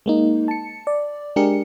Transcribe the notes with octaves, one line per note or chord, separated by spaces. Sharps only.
G#3 A#3 D#4
A5 C#7
D5
G#3 D4 G4 G#4 A#4 C#7